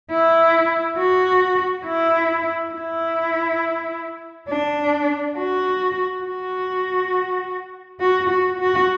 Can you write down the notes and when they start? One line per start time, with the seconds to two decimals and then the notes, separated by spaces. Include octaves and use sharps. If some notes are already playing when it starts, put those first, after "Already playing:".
0.11 E4
0.98 F#4
1.86 E4
2.73 E4
4.49 D4
5.37 F#4
6.25 F#4
8.00 F#4
8.29 F#4
8.59 F#4